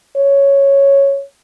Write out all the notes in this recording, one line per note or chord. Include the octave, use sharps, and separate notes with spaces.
C#5